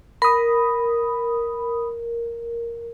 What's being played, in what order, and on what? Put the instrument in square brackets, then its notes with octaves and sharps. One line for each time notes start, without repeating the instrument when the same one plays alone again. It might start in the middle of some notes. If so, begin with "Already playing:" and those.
[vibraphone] A#4 [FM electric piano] B5 D#6